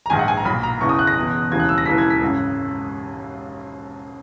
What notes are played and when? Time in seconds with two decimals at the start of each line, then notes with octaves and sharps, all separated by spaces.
0.06 A#5
0.10 A#1 G#2 D#3 G#5
0.19 F#5
0.28 G#5
0.37 A#5
0.45 B1 A#2 B5
0.63 A#5
0.81 F#1 E2 C#3 E3 C#6
0.89 D#6
0.99 F#6
1.07 A#6
1.16 F#1 E2 B2
1.50 E1 D#2 C#3 E3 G#6
1.60 F#6
1.69 E6
1.78 A#6
1.86 E1 D#2 C#3 E3 B6
1.98 G#6
2.10 B6
2.22 G#1 F#2 C#3